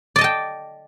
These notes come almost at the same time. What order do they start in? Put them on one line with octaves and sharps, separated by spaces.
D5 D#5 A5 G5